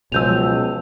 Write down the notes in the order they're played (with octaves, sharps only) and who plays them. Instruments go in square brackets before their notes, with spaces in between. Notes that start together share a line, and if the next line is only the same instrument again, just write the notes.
[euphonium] C#2 [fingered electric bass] B2 F#3 [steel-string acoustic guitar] F3 G#5 [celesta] E6 G6 F7